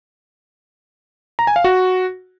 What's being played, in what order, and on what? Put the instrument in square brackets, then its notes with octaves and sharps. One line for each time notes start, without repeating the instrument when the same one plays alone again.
[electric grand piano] A#5
G#5
F5
F#4